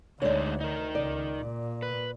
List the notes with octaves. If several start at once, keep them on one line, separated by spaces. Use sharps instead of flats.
D2 D3 G#3 D#4 C#5 D5
D#4 A#4
C#2 D5
A#2
B4